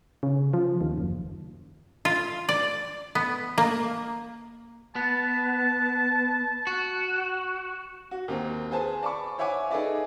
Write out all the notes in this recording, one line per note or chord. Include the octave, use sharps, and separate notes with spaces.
C#3
F3
D#2
F#1
F4
D5
B3
A#3
B3 A5
F#4
F#4
D#2 C4 A#4
G#4 B4 C5 G#5 A5
D5 A5 B5 C#6
C5 C#5 E5 F#5 G#5 D6
D#4 G#4 A4 B4 D5 E5